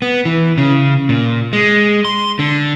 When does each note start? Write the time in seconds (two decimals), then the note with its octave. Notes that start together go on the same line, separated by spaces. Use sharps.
0.02 B3
0.25 E3
0.58 C#3
1.09 A#2
1.53 G#3
2.05 C6
2.39 D3